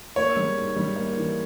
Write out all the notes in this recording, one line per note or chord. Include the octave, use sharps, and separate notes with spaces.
A#3 C#5
G3
G#2
G3
A#3
E3